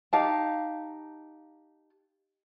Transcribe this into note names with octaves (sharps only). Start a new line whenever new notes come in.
D#4 G4 F5 A5